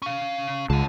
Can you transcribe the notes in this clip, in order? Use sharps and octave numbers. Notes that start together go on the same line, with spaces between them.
C#4 F5
C#2 F#5 A5